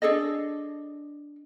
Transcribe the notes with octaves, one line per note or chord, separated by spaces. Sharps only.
D4 G#4 A4 D#5